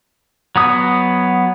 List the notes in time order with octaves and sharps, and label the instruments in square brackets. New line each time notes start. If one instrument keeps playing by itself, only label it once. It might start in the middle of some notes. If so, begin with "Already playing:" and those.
[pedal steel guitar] F#3 B3 D#6